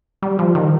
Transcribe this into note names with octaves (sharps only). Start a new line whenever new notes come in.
G3
F3
D#3